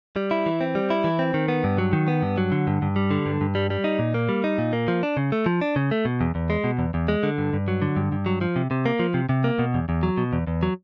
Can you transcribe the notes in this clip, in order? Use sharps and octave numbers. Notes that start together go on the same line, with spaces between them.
G3
E4
E3
C4
G3
E4
E3
C4
D#3
B3
G2
F#3
D#3
B3
G2
F#3
D3
G2
G2
G3
D3
G2
G2
G3
G3
D#4
A#2
A#3
G3
D#4
A#2
A#3
F3
D4
C#3
A3
F3
D4
C#3
A3
B2
E2
E2
G#3
B2
E2
E2
G#3
D3
G2
G2
F#3
D3
G2
G2
F#3
F3
C3
C3
A#3
F3
C3
C3
A#3
B2
E2
E2
F#3
B2
E2
E2
F#3